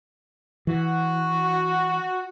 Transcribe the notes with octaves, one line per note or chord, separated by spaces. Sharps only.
E3 F#4